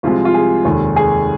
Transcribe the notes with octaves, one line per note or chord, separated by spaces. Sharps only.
C2 C3 F3 G#3 F4
F4
G#4
F1 D#2 D#3 G#3
G#4